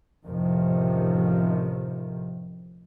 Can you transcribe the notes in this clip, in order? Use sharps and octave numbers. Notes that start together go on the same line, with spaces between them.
A1 F2 C3 D#3 F3